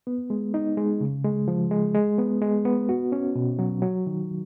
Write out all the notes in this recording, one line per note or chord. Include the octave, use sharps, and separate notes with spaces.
B3
G#3
D#4
G#3
C#3
G#3
F3
G#3
G#3
B3
G#3
B3
F#4
C#4
B2
F#3
F#3
D#3